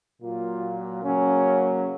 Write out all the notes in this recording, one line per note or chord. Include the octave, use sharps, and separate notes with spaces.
A#2 F#3 A#3 F4
C#3 F#3 A#3 C#4